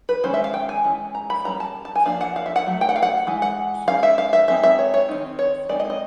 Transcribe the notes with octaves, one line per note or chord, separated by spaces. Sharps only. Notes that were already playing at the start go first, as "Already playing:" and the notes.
B4
D#3 G#3 C#4 C5
E5
F5
G5
G#5
E3 G#3 C#4
A#5
B5
G3 A#3 C#4 A#5
A5
A5
G#5
F3 A#3 D4 F5
F#5
F5
E5
F#5
F#3 A3
G5
F#5
F5
F#5
E3 G#3
F#5
G#3 C#4 F5
E5
F5
E5
G#3 C4 D#4 E5
E5
C#5
C#5
D#3 G#3 C4 D#4
C#5
G#3 C4 D#4 D5
D#5
D5
D#5